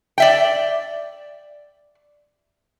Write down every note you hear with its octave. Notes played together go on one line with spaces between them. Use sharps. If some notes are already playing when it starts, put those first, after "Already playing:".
D5 E5 G5